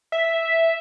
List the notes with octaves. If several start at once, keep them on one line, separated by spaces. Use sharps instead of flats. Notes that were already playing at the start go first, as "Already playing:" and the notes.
E5